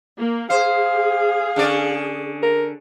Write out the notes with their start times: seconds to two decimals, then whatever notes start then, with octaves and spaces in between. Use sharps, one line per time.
0.18 A#3
0.50 G#4 C5 F5
1.56 D3 C#4 D5
2.43 A#4